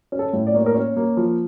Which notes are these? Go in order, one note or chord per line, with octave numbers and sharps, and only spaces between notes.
C#4
A4
A2
D5
A#3 C#5
A#4
C#4 C#5
A#3
F3